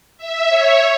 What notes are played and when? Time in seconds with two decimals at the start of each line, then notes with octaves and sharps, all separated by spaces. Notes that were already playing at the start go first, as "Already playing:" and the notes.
0.18 E5
0.49 C#5